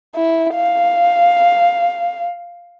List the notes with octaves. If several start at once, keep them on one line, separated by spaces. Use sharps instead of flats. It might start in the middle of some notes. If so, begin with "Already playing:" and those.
E4
F5